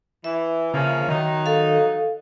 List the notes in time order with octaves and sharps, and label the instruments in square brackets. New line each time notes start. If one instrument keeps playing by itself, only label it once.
[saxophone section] E3 [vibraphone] E5
[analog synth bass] C#3 [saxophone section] F3 A#3 C#4
[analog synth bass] D#3 [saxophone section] F#3 D#4
[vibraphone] A4 F5